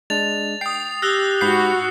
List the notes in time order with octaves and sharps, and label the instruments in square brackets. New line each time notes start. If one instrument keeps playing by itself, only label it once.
[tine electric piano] G#3 D4 [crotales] A6 F7
[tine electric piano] G5 [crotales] D#6 C7
[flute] G4 [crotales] E6 F#6 G7 [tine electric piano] A#6
[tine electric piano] G#2 B5 G6 [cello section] F#4 [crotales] C7